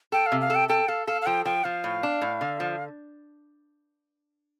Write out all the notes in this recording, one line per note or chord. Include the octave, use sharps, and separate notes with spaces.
A4 G5
F5
C3
F5
A4
G5
A4 G5
A4 F5
A4 F5
F5
F3 G5
F3 G5
F3 F5
A2
D4
A2
D3
F3